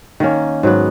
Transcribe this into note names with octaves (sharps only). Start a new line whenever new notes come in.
D#3 A#3 C#4
G#2 F#3 B3